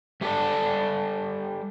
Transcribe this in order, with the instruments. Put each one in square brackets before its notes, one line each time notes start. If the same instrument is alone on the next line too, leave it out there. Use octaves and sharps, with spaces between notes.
[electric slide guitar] G3 A3 G4 A4 B4 D5